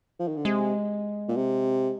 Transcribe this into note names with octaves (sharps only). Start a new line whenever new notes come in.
F3
D#3
D3
C3 G#3
A#2
C3